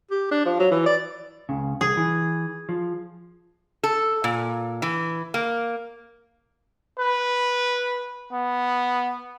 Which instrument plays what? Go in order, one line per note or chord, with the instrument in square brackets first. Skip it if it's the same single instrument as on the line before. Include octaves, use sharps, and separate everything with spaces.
[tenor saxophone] G4
D4
F3
F#3
E3
D5
[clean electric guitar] C#2 C#3
[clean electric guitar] C2 [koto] G#4
[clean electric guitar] E3
F3
[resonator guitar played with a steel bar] A4
A#2
E3
A#3
[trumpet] B4
B3